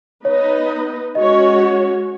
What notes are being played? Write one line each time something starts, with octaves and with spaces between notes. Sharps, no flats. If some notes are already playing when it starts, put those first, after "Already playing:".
B3 D#4 B4 C#5 D#5
G#3 C#4 F#4 C#5 D#5